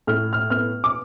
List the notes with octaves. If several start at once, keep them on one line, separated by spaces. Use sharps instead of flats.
A2 F6
F6
B3 F6
D6